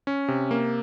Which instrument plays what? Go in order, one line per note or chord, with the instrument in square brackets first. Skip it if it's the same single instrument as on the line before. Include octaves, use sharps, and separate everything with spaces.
[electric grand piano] C#4
C3
A#3